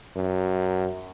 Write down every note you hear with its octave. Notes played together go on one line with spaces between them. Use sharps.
F#2